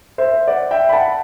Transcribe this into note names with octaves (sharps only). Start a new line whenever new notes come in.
C5 E5
D5 F#5
E5 G5
B5
F#5 A5